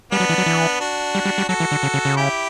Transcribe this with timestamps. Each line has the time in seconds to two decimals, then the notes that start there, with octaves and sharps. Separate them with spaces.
0.12 G3 B3 D4
0.20 F#3
0.29 E3
0.38 F#3
0.46 E3
0.80 D4 F#4
1.15 G3
1.25 G3
1.38 G3
1.49 F#3 F#4 A4
1.60 E3
1.71 D3
1.83 C#3
1.94 C#3
2.05 C#3
2.17 E4 G4